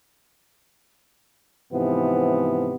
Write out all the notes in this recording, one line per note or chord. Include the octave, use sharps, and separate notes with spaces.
G#2 C3 E3 F3 B3